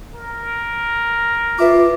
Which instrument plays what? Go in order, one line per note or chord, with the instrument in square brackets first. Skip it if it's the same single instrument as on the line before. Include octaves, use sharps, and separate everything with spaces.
[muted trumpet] A#4
[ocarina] F4 [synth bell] B4 E5 D6